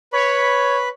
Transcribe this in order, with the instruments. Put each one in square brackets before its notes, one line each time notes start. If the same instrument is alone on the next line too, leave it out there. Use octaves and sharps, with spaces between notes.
[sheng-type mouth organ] B4 B5 [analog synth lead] C#5